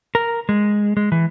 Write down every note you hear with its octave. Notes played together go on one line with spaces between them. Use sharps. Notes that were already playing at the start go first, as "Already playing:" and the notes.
A#4
G#3
G#3
E3